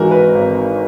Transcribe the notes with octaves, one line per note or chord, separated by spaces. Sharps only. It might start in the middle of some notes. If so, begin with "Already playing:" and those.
Already playing: G#1 G#2 E3 G#3 F#4 A#4
B4
G#1